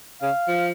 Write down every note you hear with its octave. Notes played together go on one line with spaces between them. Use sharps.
C#3 F5
F3